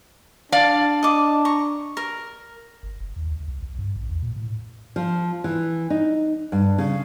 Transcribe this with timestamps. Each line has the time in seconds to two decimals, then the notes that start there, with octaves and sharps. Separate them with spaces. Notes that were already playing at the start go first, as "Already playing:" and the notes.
0.52 D4 D5 F5
1.03 D#5 D6
1.45 A#5 C#6
1.97 A#4
2.83 G1
3.00 F#1
3.16 D#2
3.31 C#2
3.48 C2
3.62 C2
3.79 G2
3.96 A#1
4.09 E2
4.22 A#2
4.36 A2
4.96 F3
5.44 E3
5.90 D#4
6.52 G2
6.78 C#3